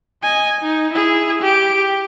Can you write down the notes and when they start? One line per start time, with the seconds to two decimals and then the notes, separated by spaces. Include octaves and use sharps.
0.23 D#5 G#5
0.61 D#4
0.93 E4 G#4
1.42 G4 D7
1.76 G4